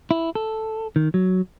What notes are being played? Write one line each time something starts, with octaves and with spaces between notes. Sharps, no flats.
E4
A4
D#3
F#3